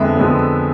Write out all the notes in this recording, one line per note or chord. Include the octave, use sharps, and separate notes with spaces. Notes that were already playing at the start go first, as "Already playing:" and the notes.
Already playing: F2 D3 G#3 B3 E5
F2 D3 G#3 B3